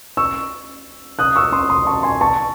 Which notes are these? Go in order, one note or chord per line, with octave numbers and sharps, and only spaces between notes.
C#6 E6
D#6 F#6
C#6 E6
C6 D#6
C6 D#6
A5 C#6
G#5 C6
A5 C#6